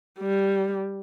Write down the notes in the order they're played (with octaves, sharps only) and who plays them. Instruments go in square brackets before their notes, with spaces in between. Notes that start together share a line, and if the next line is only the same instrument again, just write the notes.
[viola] G3